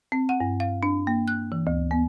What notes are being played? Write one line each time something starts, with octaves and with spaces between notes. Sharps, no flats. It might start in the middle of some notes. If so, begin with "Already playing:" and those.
C4
F#5
G2
F5
D4
A#3
F#6
E3
D2
B3